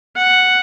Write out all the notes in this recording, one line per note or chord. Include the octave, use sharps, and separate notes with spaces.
F#5